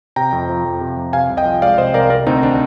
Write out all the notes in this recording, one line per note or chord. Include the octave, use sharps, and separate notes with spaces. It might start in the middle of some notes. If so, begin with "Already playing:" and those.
C3 G5 A#5
F2
F3
F2
C3
F2
C3 F5 G#5
C2
D#5 G5
F3
G#3 D5 F5
C3 C5 D#5
C2 A#4 D5
C3 A#4 D5
D2 C4 D#4
D#3 D4